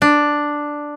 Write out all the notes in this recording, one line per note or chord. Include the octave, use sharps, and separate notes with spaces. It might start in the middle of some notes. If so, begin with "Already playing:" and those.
D4